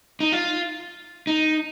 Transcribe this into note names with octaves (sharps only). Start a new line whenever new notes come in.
D#4
F4
D#4